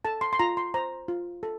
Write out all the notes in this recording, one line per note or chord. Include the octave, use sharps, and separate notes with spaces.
A4 A5
C6
C6
F4 A#5
C6
C5 A#5
F4
A4